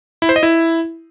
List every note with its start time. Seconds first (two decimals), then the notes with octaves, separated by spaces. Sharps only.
0.22 E4
0.29 C5
0.36 D#5
0.43 E4